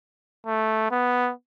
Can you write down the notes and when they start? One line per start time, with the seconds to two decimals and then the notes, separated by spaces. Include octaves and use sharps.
0.47 A3
0.91 B3